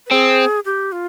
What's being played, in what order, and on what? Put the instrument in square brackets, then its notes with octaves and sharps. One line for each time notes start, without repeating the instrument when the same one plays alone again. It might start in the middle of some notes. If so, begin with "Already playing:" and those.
[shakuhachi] B4
[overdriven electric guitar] C4 [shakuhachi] G#4
[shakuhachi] G4
F4